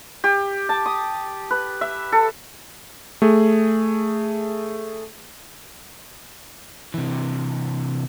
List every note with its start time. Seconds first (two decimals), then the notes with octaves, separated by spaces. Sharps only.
0.24 G4
0.69 A5
0.86 D#6
1.51 B4
1.81 E5
2.12 A4
3.22 A3 G#4
6.94 C3 E3